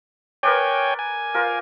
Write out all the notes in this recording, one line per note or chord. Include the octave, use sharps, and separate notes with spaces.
A#4 B4 C#5 D5 G5 G#5
G#5
F4 A#4 C5